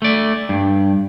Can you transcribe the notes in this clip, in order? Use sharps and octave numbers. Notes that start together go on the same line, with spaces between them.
A3 D5
G2